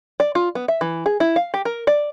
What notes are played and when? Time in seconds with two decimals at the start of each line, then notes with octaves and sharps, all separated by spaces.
0.20 D5
0.35 F4
0.55 B3
0.68 E5
0.81 E3
1.06 G#4
1.20 E4
1.36 F5
1.54 G4
1.65 A#4
1.87 D5